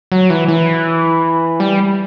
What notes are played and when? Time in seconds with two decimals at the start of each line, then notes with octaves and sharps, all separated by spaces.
0.12 F#3
0.30 E3
0.48 E3
1.60 G3